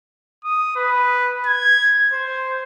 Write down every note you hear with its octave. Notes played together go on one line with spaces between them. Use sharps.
D#6
B4
G#6
C5